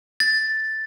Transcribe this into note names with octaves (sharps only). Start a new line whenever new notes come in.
A6